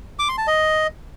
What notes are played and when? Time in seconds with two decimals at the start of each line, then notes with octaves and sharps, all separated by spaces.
0.19 D6
0.29 C6
0.38 A5
0.47 D#5